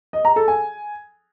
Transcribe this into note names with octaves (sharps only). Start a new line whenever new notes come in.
D#5
A#5
A4
G#5